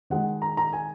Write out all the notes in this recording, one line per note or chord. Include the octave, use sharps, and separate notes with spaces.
D#3 G#3 F#5
A#5
A#5
G#5